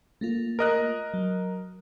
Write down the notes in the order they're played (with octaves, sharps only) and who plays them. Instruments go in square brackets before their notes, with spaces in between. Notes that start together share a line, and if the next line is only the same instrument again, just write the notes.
[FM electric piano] A3 A#3 F4
[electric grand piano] A#4 D#5 F#6
[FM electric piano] F#3